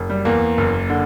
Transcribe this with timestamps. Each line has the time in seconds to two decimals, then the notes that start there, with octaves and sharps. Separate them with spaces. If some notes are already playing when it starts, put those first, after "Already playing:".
Already playing: F#1
0.10 G3
0.25 E2 A#3
0.57 F#1
0.90 D3